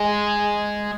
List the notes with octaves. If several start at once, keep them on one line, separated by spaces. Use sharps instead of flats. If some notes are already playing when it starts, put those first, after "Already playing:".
Already playing: G#3